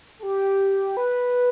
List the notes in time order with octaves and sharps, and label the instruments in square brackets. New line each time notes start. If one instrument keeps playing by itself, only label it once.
[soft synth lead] A4
G4
B4